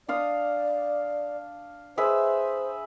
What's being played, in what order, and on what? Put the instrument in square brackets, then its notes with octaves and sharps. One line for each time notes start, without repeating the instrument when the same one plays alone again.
[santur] D4 F5 D#6 [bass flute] D5
[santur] G#4 B4 E5 [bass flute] C5